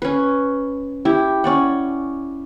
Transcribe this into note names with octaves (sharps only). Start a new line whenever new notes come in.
C#4 B4
E4 G4
C#4 D5 F#5